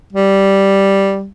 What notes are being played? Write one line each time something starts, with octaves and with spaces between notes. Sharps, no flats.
G3